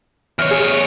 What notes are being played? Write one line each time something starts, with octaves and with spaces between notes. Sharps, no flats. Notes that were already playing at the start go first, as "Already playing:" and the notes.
E2 C#5 F6
G#4